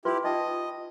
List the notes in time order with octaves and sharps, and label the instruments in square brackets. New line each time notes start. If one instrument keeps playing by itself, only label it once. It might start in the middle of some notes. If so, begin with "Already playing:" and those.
[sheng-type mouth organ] E4 G4 [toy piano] F4 B4 C6
[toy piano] D#4 F4 G5 [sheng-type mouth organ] D#5